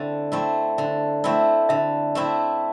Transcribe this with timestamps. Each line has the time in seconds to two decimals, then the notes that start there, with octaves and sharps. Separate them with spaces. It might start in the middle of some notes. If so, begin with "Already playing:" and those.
Already playing: D3 A3 C4 E4
0.32 A3 C4 E4
0.78 D3
1.24 A3 C4 E4
1.69 D3 E5
2.15 A3 C4 E4